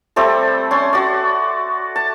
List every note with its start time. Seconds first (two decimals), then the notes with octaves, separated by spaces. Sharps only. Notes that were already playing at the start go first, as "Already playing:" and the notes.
0.16 G3 A3 C4 A4
0.71 C#4 C6
0.93 F#4 D5
1.96 A5